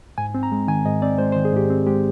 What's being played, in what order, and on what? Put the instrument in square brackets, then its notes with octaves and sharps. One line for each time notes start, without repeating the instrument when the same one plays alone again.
[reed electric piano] G#2 G#5
C4
A#5
G#3
D#3 G#5
G#2 D#5
C4 D5
G#3 C5
C5
D#3
G#4
G#2 G4
C4
G#3 G4